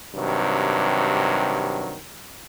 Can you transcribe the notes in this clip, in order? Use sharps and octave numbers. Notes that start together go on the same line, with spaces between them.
G2 C3 D#3 F#3